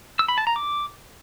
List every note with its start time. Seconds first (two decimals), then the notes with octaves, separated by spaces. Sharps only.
0.19 E6
0.28 B5
0.38 A5
0.47 A#5
0.56 D6